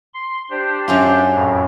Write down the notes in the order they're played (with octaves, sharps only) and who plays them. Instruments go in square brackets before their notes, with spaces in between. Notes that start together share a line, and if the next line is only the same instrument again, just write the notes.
[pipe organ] C6
D4 G4 C5
[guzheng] F#2 C#4 F4
[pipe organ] F2 A2